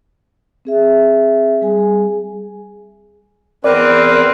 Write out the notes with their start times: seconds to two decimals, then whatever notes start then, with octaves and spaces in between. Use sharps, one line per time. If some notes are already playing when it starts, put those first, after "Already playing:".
0.65 C4 G#4 E5
1.61 G3 G#4 G#5
3.64 E2 C4 A#4 B4 D5